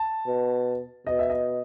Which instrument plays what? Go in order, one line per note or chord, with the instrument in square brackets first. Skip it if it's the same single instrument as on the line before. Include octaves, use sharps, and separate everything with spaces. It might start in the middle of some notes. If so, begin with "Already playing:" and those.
Already playing: [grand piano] A5
[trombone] B2
[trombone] B2 [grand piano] D#5
[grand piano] E5
D#5